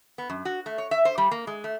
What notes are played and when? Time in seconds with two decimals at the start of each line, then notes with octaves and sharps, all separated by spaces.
0.18 B3
0.29 F#2
0.45 F#4
0.66 A3
0.78 C#5
0.91 E5
1.05 C5
1.18 G3
1.31 A#3
1.47 G#3
1.64 A3